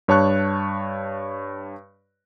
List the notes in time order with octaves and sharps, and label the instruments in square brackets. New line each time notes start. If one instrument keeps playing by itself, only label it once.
[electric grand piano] G2 C#5 A5 C#6 F#6